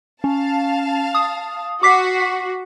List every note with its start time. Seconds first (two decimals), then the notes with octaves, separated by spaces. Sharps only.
0.24 C#4 F5 A5
1.15 D#6
1.83 F#4 D6 B6 C7